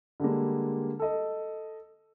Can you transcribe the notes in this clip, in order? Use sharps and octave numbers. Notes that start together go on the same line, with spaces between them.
D3 G3 G#3 A#3
A4 D#5